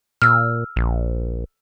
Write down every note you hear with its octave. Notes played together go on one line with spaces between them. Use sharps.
A#2 E6 F6
A#1